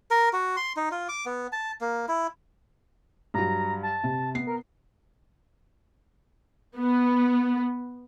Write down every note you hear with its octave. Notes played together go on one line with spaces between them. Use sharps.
A#4
F#4
C6
D#4
F4
D6
B3
A5
A#3
E4
G2 F#3 A#5
A5
C3
B3 C7
A#4
B3